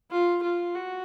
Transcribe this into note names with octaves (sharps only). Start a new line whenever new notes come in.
F4
F4
F#4